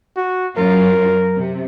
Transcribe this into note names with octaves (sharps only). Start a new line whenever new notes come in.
F#4
F#2 C#4 F4 A#4
C3